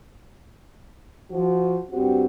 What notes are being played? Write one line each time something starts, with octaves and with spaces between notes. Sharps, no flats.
F3 F#4
G2 C4 F#4 G4